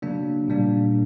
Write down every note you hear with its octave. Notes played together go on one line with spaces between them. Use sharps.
C#3 F#3 A#3 D4
A#2 G3 A#3 D4